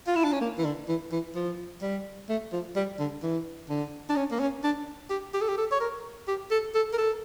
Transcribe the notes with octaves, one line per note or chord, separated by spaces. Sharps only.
F4
E4
D4
C#4
A#3
E3
D3
E3
E3
F3
G3
A3
F3
G3
D3
E3
D3
D4
C#4
A#3
C#4
D4
G4
G4
A4
G4
A4
C#5
A#4
G4
A4
A4
A#4
A4